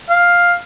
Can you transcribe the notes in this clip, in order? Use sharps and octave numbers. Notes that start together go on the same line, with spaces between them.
F5